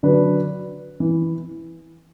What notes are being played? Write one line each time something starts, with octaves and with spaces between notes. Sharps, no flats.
D3 F#3 D4 B4
E3